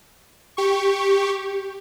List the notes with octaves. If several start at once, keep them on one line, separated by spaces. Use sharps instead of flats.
G4 C#6